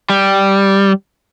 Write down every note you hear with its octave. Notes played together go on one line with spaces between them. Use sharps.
G3